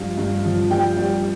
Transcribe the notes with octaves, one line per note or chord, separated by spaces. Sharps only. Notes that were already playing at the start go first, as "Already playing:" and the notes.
Already playing: G2 F3 F5
G2
F3
G3 G5
G3